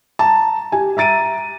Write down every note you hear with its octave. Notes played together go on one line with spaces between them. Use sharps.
A5 A#5
G4 G#5
E5 A#5 A6 D7 D#7